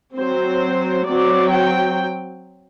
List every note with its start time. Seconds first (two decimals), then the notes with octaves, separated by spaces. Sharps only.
0.15 F#3 C4 C5
1.05 F#3 C4 D5
1.50 G5